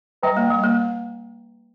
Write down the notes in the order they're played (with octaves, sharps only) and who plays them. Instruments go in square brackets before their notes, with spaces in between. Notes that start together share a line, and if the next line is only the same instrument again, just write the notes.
[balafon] G3 [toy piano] B4 E5 G5 A#5
[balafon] A#3
G3
A#3